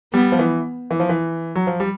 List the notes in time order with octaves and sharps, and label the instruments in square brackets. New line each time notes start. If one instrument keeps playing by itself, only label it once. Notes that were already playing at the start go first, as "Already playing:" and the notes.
[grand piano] G3 [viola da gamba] B3
[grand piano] F3
E3
E3
F3
E3
F#3
F3
G3